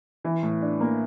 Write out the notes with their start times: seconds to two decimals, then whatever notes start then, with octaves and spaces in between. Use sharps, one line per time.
0.25 E3
0.43 A2
0.62 D4
0.81 A#3